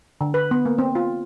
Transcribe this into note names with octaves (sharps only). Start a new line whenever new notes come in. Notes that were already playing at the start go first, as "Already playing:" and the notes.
D3
B4
B3
A#3
C4
F4